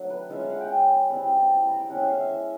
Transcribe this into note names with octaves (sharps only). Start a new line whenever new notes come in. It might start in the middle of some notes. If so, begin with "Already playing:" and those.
Already playing: F#3 A3 D4
B4
G#3 C#4 F4 E5
F5
F#5
G5
G#5
A5
G3 C4 E4 B5
B5
A5
A5
B5
A#5
G5
G#3 C#4 E4 F#5
E5
F5
E5
E5